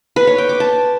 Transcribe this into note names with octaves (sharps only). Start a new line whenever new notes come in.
B4
C#5
G5
D6
A5